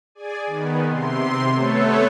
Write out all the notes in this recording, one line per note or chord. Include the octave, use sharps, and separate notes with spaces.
G#4 D5 G#5
D#3 B3
C3 C6
A3 B3 A4 C#5